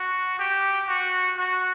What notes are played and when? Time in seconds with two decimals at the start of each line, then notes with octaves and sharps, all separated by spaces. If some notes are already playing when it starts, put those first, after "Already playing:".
Already playing: F#4
0.39 G4
0.88 F#4
1.37 F#4